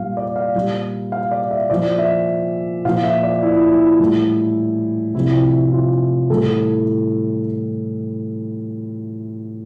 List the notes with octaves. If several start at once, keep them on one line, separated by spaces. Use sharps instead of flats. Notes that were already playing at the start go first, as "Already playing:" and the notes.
Already playing: A#2 G3 F5
D5
F5
A#2 G3
F5
D5
E5
A#2 F3 D5
E5
A#2 F3 F5
E5
D5
E4
E4
A2 E3 G3
C3 F3 E4
F4
A2 E3 G3 A4